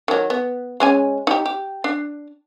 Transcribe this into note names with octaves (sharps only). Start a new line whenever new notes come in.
D#3 F#3
B3
G#3 C#4 G#5
D#4 G4
G4
D4